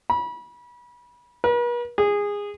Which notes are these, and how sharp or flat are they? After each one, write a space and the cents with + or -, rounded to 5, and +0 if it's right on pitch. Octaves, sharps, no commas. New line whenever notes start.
B5 -30
B4 -45
G#4 -20